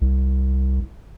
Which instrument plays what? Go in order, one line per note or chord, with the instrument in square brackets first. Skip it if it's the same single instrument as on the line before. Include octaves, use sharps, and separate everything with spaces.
[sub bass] C2